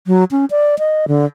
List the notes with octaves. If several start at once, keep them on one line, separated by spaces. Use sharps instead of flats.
F#3
C#4
D5
D#5
D3